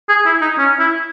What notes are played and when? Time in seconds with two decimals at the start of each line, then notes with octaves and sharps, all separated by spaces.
0.09 G#4
0.26 E4
0.41 D#4
0.58 C#4
0.79 E4